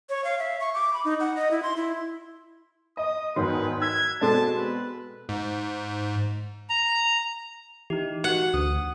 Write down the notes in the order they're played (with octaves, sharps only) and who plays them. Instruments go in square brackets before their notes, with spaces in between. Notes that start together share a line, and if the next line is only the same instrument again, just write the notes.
[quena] C#5
F5
E5
C#6
D6
B5
D#4
F#5
D#5
E4
C6
E4
[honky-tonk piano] D#5 [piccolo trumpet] D#6
[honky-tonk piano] E2 G#2 D#3 [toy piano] F#4 C#5 [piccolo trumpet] B4
[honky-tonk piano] E6 F#6 B6 [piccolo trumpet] G#6
[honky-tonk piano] B2 G#3 C4 [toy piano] F#4 A4 D5 [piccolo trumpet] A5
[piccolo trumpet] B4
[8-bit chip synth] G#2
[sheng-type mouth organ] A#5
[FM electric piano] E3 [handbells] D#4 G4
[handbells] F#4 [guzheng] F#5
[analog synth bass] D2 [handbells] D#6